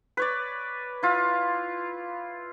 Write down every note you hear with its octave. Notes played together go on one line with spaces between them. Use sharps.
B4 C#5 D5
E4 F4